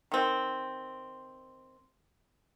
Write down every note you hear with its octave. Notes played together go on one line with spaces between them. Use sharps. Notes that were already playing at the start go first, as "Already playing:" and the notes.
D#3 C4